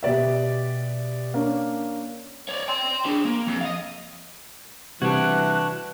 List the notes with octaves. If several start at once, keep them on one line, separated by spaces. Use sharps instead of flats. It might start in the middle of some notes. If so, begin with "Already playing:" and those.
B2 G4 D5 E5
A#3 C#4 D4
C#5 D5
G5 C6
D4 G#4
A#3
F2
D#5 F5
C3 E3 G3 D4 F#4 F#6 G#6